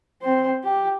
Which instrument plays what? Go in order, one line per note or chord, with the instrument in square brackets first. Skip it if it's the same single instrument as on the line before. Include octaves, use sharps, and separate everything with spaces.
[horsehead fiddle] C4 C5
G4